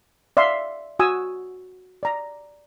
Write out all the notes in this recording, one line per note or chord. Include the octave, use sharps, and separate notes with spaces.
D5 E5 F5 C6
F#4 G#5 D#6 E6
D5 A#5